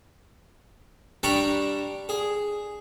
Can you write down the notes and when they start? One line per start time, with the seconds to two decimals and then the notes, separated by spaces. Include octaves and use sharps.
1.23 G3 D4 D5 A#5 B5 C#6
2.09 G#4